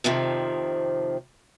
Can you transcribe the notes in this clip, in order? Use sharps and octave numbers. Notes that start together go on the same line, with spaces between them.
F2 C3 D#3 F3